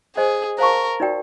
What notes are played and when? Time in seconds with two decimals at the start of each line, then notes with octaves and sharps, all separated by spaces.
0.16 G#4 C5 D#5 G#5
0.58 A#4 C5 F5 A5 C#6
1.00 D#4 F#4 A#4 D5 G5